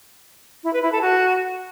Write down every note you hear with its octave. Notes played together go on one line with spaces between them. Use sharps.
E4
B4
E4
A4
F#4